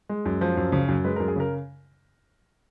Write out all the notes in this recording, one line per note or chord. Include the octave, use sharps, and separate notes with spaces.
G#3
F#2
F3
F#2
C#3
F#2
G#3 B4
F#2 A#4
G#4
C#3 A#4